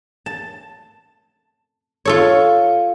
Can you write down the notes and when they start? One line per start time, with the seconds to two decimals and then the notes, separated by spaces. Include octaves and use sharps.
0.26 A5
2.05 F4 A4 C#5